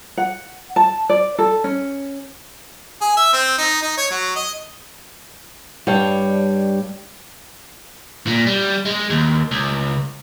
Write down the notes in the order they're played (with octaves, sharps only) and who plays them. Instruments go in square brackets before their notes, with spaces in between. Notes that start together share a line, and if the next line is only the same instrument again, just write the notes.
[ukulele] F#5
A5
D5
A4
C#4
[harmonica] G#4
E5
C4
D#4
D#4
C#5
F#3
D#5
[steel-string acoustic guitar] G2 G3 C#5 G5
[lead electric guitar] A#2
G3
G#3
D#2
C#2